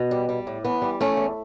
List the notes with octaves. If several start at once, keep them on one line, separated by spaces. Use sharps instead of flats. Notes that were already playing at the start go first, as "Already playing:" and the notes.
Already playing: B2
G3
G3
A2
E3 B3
G3
E2 A3 C#4
E2